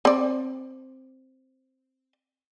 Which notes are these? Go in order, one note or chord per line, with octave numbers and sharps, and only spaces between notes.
C4 D5